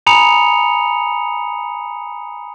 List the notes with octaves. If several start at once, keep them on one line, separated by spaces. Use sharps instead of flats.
G#5 A#5 B5 D#6 C#7 F7